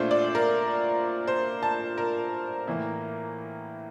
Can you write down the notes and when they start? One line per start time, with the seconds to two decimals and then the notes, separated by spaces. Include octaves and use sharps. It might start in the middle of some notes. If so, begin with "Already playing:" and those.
Already playing: A#2 A3 D4 F4 C5
0.11 D5
0.35 A#4
1.28 C5
1.63 A5
1.98 A#4
2.67 A2 E3 A#3 E4